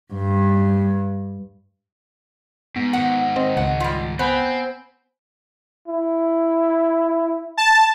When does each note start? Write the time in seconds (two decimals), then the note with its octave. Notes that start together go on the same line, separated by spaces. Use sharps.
0.13 G2
2.76 G#2 B3
2.93 G#2 D#3 F#5
3.36 C4 D#5
3.57 C#2 F#5
3.80 G3 F4
4.19 B3 C4 C5 G#5 B5
5.88 E4
7.57 A5